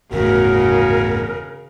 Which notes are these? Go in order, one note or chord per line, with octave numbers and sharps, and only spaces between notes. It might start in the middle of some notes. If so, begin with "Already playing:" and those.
G1 E2 A2 C#3 F#4 A#4